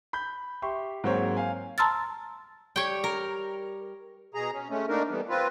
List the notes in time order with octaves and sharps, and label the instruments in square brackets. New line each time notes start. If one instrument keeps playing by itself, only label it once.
[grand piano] B5 G6
G4 E5 C6 C#6
G#2 F#3 A#3 C4 C5 C#5
F5 G#5
[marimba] A5 A#5 C6 E6 F6 A6
[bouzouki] G3 [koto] C#5 G5
[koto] A#4
[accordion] B2 G#4 A#5
C#4
G#3 A3 C#4
A3 A#3 D4 D#4 A#4
E3 G3 A3 B3
C4 F4 B4